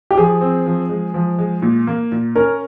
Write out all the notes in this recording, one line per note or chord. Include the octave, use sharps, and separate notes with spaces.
G4
F3 G#4
C4
F3
G#3
F3
G#3
A#2
A#3
A#2
C#4 A#4